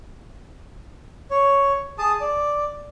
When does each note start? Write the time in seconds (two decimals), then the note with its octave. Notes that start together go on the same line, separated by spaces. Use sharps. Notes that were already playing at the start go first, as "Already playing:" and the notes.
1.31 C#5
1.99 G#4 A5 D#6
2.21 D5